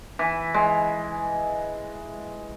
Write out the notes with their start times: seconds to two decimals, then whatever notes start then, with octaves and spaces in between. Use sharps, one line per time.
0.19 E3
0.54 G#3